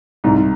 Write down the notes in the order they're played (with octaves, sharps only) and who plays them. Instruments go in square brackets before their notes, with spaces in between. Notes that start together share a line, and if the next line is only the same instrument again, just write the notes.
[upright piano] C2 [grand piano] G#2